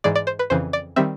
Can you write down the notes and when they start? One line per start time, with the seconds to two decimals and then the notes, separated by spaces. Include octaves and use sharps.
0.04 G#2 E3 G#3 D5
0.16 D5
0.27 C5
0.39 B4
0.50 F2 C#3 E3 C5
0.73 D5
0.96 D#3 G3 C4 E5